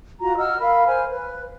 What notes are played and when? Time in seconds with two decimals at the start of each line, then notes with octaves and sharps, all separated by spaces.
0.20 F4 F#4 A#5
0.37 D#5 F#5 E6 F6
0.59 A#4 F5 B5
0.86 C5 G#5 F6
1.12 B4